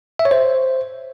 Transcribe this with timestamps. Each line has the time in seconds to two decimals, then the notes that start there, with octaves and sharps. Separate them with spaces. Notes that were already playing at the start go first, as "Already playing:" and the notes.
0.19 E5
0.25 C#5
0.31 C5